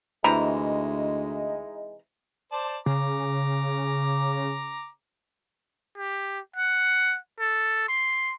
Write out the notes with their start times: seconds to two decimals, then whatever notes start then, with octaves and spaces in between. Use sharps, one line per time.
0.24 D2 C3 E3 G#3 D#4 E4 A#5
2.52 C5 D5 A5
2.86 C#3 A#5 D6
5.97 G4
6.56 F#5
7.39 A4
7.88 C6